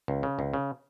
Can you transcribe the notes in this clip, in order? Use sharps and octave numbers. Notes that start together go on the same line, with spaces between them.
C#2
C#3
C#2
C#3